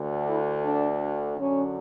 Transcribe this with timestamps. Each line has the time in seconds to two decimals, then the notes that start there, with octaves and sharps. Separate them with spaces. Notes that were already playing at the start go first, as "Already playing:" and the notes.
Already playing: D2 D3
0.27 E4
0.64 D4
1.38 F#2 D3 C#4